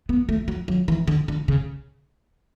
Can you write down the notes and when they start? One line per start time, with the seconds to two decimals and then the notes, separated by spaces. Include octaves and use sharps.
0.09 B3
0.29 A3
0.48 F#3
0.68 F#3
0.88 E3
1.07 D3
1.28 D3
1.48 C#3